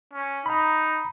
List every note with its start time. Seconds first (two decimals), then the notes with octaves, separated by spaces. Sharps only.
0.13 C#4
0.46 D#4 A#5 B5